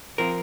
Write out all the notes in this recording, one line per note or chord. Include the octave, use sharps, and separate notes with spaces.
F3 C4 A#4